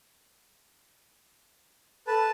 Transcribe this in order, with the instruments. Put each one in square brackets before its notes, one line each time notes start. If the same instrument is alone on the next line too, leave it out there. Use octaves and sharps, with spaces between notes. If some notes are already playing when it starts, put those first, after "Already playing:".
[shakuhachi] A4 [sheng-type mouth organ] B4 A5